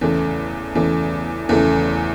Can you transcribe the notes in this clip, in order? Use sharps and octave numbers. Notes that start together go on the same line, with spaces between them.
E2 C#3 E3 A3
E2 C#3 E3 A3
E2 C#3 E3 A3